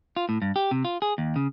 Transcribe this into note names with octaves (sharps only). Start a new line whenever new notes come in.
F4
A2
G2
G4
C3
F4
G#4
D#2
C#3